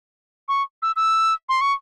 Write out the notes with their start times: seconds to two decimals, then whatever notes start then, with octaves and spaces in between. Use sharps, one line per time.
0.48 C#6
0.82 E6
0.96 E6
1.49 C6
1.61 C#6